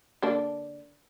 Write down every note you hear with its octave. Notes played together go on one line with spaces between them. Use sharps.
D3 A#3 D4